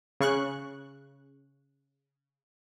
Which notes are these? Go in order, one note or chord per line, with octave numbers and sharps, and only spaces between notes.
C#3 C#6 F#6